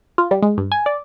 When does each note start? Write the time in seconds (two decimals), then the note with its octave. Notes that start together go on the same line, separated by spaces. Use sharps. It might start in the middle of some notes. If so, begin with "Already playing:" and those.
0.18 F4
0.31 G3
0.42 G#3
0.57 G2
0.72 G#5
0.86 D5